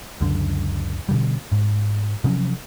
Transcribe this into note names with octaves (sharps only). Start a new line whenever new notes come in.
C#2 F#2 D3
B2 D3 G3
G#2
C3 F3 F#3 C#4